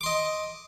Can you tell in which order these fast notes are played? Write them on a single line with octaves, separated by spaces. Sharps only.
D6 C6 D#5